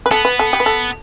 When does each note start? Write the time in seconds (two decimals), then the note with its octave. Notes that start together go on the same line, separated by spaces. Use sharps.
0.06 B4
0.11 B3 A4
0.25 B4
0.39 A4
0.53 G4
0.60 B4
0.66 A4